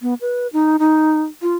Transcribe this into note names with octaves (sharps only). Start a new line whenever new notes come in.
B3
B4
D#4
D#4
F4